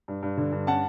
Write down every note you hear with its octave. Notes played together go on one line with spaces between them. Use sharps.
G2
G2
D3
G2
C#4 F#5 A5